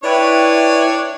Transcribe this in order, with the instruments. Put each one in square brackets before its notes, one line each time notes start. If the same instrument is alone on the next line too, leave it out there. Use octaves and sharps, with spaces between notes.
[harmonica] D4 C#5 [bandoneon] E4 B4 D5 [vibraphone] E5 G5 C#6